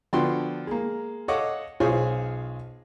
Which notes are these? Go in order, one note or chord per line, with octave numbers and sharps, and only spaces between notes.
D3 F3 B3 F#4 G5 C6
G#3 A#3
A4 C#5 D#5 F5 F#5 D6
B1 F4 G#4 C5 C#5 G#5